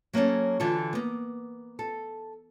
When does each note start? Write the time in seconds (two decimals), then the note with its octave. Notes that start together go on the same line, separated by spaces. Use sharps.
0.13 F#3 A#3 C4 C#4 A4
0.60 D3 E3 F4 F#4 A4
0.93 A#3 B3
1.79 A4